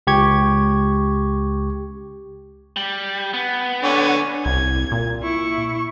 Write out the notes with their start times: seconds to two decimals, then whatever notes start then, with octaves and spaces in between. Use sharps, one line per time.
0.07 C#2 G4 C#6 G#6
2.76 G3
3.34 B3
3.84 D3 C#5 G#5
4.46 C2 G#6
4.92 A#2
5.23 E4 C#6